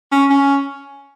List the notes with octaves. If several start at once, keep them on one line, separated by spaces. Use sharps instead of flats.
C#4
C#4